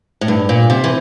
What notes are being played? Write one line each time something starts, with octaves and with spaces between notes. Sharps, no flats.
A2
G2
A#2
C3
E3